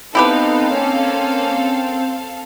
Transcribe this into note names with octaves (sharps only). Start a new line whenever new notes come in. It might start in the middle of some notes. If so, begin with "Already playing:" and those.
B3 C4 D#4 E4 G4 A4 B4 F5
A#3 C#4